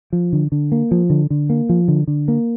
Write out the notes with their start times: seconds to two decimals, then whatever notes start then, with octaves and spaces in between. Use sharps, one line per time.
0.13 F3
0.33 D3
0.52 D3
0.72 A#3
0.91 F3
1.10 D3
1.30 D3
1.50 A#3
1.69 F3
1.88 D3
2.07 D3
2.28 A#3